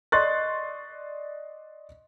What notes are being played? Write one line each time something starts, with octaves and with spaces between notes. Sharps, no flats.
D5 D#5 C6 C#6 F#6 A6